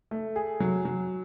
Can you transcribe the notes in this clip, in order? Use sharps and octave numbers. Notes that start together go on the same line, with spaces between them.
A3
G#4
F#3
F#3